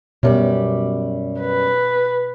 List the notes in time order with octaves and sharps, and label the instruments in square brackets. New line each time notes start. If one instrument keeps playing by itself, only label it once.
[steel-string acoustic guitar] F#2 G3 G4 [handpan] B2
[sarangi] B4